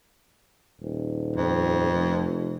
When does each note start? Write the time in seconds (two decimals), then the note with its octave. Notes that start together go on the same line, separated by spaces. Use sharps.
0.81 D#1
1.36 F2
1.93 F1